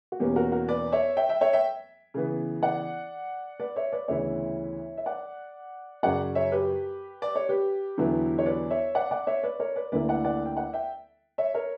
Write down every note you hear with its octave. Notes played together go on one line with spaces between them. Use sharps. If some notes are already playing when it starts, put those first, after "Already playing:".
F#4
E2 B2 A#3 C#4 G4
F#4 A#4
F#4 A#4
B4 D5
C#5 E5
E5 G5
E5 G5
C#5 E5
E5 G5
C#3 E3 B3
D5 F#5
B4 D5
C#5 E5
B4 D5
D2 C#3 E3 B3 E4 C#5 E5
E5
D5 F#5
F#2 C#3 F#3 D5 F#5
C#5 E5
G4 B4
D5
C#5
G4 B4
E2 D3 F#3 B3 E4
C#5
B4 D5
C#5 E5
D5 F#5
D5 F#5
C#5 E5
B4 D5
A#4 C#5
B4 D5
D2 D3 A#3 E4 B4 D5
D5 F#5
D5 F#5
G5
D5 F#5
E5 G5
C#5 E5
A#4 C#5